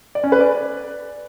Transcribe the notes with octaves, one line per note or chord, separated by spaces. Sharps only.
D5
C#4
B4
D5